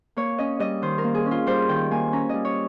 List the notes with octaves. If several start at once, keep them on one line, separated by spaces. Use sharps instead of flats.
A#3 C#5
C#4 D#5
G3 D#5
D#3 C5
A#4
A#3
G#4
C#4
F4
G3 C5
D#3 G5
A#3 G#5
C#4 A#5
G3 D#5
C#5